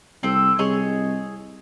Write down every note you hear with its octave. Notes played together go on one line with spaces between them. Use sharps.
C2 C4 A4
C2 G#4 C#5 D#5